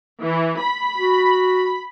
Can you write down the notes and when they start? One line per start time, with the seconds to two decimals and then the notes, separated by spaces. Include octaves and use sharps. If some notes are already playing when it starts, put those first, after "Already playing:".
0.23 E3
0.61 B5
0.98 F#4